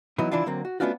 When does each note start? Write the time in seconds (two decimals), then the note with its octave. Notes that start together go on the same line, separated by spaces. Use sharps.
0.18 E3 F#3 B3 D#4 E4
0.31 E3 D4 E4 F4
0.46 D3 F#3 A#3 C4
0.65 F#4
0.80 A3 B3 C#4 D4 F4 F#4